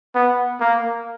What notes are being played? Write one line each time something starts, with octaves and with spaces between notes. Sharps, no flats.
B3
A#3